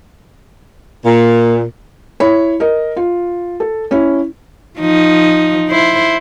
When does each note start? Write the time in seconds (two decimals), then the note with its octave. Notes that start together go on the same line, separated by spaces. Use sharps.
1.05 A#2
2.20 E4 C#5 B5
2.60 A#4 D#5
2.97 F4
3.60 A4
3.91 C#4 E4
4.79 F3 D#4
5.68 E4 C5